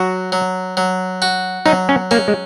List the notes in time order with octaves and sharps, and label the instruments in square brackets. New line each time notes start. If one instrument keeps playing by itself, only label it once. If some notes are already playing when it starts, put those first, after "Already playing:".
Already playing: [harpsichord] F#3 [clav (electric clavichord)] F#4
[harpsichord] F#3
F#3
F#4
[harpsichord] F#3 [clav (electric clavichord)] D#4
[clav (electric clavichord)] C#4
[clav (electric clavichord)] A#3 [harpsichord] C#4
[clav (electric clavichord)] G#3